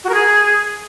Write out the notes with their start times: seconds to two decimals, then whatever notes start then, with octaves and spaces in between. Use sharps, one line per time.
0.04 F#4
0.09 A#4
0.14 G#4